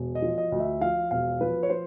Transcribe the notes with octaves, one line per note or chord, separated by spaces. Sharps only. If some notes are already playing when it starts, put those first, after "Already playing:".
Already playing: E1
D#5
F3
D#5
D2
E5
F3 F5
E1 F5
F3 B4
C#5
F3 C5